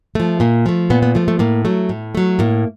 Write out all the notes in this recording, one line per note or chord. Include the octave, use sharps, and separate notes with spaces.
F3 A3
A#2 A#3
F3 A3
A#2 B3
B3
F3 A3
A3
A2 A#3
F#3 A3
A2
F#3 A3
A2 A#3